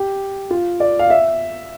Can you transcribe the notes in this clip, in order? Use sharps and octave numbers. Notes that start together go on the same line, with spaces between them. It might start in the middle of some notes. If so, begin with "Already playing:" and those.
Already playing: G4
F4
D5
F5
E5